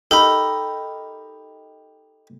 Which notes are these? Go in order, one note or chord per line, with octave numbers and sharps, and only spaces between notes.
D#4 G4 A4 A#4 B5